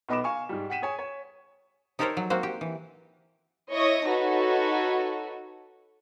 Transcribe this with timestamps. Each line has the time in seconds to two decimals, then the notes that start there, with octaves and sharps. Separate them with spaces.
0.09 B1 B3 D#5 B5 D6 E7
0.24 F5 G#5 C#6
0.49 G#2 G3
0.70 F#5 G5 B6 D#7 E7
0.82 G#4 C#5 G#5
0.99 C#5
1.99 D#4 G4 A4 A#4 C5 C#5
2.17 F#3
2.30 A#3 C4 F#4 C5
2.43 G4
2.61 E3
3.71 E4 C#5 D#5 C#6 D#6 A#6
4.07 D#4 F#4 A4 B4 C#5